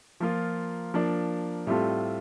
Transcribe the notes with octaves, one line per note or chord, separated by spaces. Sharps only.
F3 A#3 F4
F3 A#3 D4
A2 G3 C4 F4 A4